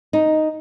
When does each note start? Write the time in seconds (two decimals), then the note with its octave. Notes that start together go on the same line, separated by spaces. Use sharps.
0.13 D#4